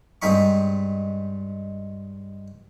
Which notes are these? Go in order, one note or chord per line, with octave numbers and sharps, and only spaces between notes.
G2 G#3 C4 D#4 B5 C#6